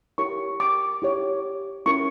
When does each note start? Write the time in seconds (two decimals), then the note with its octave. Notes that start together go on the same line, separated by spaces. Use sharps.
0.18 E4 G4 A#4 C#5 C#6
0.60 D6
1.02 E4 G4 C#5
1.86 C#4 E4 A#4 C#6